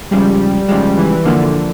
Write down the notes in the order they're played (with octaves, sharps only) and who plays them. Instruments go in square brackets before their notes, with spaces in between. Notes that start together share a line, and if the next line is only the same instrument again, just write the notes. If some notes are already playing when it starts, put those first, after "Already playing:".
[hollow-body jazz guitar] C#3 F3 G#3 [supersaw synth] G3
[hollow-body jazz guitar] C#3 F3 G#3 [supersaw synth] G3
[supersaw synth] E3
[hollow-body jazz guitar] A#2 F3 A#3 [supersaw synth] D3